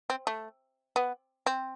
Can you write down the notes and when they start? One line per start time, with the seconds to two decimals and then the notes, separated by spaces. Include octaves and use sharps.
0.10 C4
0.27 A3
0.96 B3
1.46 C4